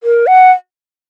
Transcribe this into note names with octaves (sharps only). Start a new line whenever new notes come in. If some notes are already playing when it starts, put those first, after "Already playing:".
A#4
F#5